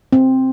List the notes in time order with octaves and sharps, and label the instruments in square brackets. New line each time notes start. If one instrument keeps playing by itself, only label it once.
[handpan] C4